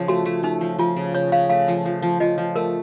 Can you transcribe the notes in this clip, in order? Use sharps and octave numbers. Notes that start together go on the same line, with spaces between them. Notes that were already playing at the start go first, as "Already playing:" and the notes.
Already playing: C#3 F3
A3 F#4
A3
A3 D#4
F3
F3 F4
C#3
C#3 C#5
C#3 F5
A3 F5
F3
F3
F3
F3 D#5
F3
A3 A#4